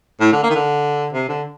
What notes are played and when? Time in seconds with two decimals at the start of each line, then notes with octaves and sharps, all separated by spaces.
0.20 A2
0.32 D3
0.43 A#3
0.50 D#3
0.55 D3
1.13 C3
1.29 D3